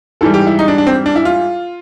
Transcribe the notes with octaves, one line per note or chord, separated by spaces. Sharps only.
G#2 E3 G3 A4
G4
E4
D#4
D4
D4
C4
D4
E4
F4